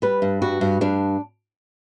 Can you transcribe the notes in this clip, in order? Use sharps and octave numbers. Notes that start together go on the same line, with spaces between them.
G3 B4
G2
G3 F#4
G2
G2 D4